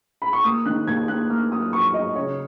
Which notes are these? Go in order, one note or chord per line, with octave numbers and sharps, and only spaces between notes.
B5
C#6
A#3 D#6
D#3 F#6
D#2 G#6
A#3 F#6
A#3 F6
F#3 D#6
F#3 C#6
F#3 D#5
C#3 C#5